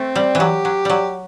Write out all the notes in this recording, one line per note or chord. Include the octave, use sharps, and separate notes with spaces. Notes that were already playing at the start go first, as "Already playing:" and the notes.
Already playing: A3 C4
G3
E3
F#3 G4
F#3
F#3 G3